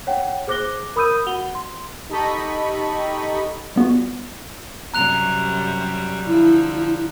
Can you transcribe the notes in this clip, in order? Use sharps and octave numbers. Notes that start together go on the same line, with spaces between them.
C#5 F#5 G5
G#4 C5 D6 F#6 A#6 G7
A#4 B5 D#6 E6 G6 D#7
F#4 F#5 F7 G7
C6
D#4 G4 A4 D#5 B5 C#6
G3 B3 F4 F#4
F#2 C3 G3 A#5 F#6 F7
D3 F3 G3 E4